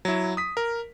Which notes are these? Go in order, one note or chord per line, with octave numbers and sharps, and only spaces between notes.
F#3 E4
D#6 B6
A#4